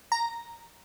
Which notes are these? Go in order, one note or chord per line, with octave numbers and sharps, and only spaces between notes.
A#5